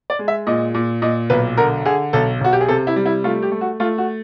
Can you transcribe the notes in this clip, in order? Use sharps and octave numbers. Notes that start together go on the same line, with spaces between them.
D5
G#3
E5
A#2 D#5
A#2
A#2 D#5
B1 B4
D3 A#4
D3 G#4
B1 A4
B1 F#4
G4
G#4
C3 A4
E4
G3
E4
A3 F4
G4
A3
F#4
A3 F4
F#4